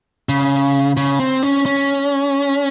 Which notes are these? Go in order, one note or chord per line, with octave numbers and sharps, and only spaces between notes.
C#3
C#3
C4
C#4
C#4